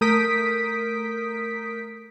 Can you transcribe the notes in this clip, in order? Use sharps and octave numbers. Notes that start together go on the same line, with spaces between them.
A3 A#4 D#6 G6 B6 D7